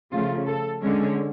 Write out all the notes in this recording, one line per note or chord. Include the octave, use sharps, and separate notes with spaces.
C#3 F3 A3 F4
A4
D3 G#3 C#4